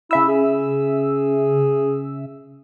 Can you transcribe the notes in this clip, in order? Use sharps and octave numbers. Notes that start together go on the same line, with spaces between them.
C#3 E4 E5 E6
G#4